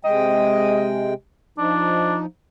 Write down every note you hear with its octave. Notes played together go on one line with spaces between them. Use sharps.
C3 G#3 D#5 G5
F3 D4 D#4